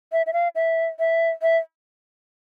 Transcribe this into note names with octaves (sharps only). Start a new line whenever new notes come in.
E5
E5
F5
E5
E5
E5